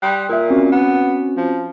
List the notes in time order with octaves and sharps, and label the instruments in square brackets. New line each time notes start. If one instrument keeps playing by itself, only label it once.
[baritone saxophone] G3 [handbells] C6 D#6 F#6
[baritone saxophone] A#2 [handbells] A#4 E5
[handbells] C4 C#4 F#4
[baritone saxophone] B3
F3